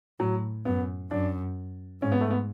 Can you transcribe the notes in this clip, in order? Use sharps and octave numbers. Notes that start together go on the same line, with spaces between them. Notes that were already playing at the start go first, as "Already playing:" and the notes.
A2 F#3
F#2 B3
F#2 D4
G#2 C#4
B3
A3
B3